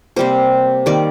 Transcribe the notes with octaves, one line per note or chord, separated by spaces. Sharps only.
C3 G3 A#3 C5
D#3 G3 A#3 D5